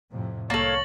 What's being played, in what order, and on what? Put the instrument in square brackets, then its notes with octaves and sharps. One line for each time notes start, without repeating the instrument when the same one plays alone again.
[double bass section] F2 A2 C3
[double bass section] C2 [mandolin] A#3 A4 [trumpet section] C#5 [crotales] A6 A#6 F#7